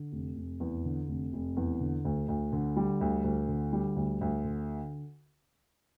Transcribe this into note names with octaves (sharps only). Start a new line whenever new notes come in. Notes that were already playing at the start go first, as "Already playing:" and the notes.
Already playing: D3
F1
F1
E2
D3
F1
F1
E2
D3
D2
D2
D3
G3
D2
D2
D3
G3
D2
D2
D3